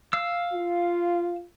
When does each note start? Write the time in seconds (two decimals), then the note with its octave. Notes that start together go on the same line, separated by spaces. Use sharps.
0.13 F5 E6
0.53 F4